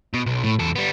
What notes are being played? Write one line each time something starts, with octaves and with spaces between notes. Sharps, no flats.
B2
B1
A2
E2 A4
G3 B3